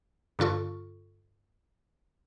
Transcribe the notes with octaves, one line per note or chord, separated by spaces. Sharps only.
G2 D3 F4 A4 C#6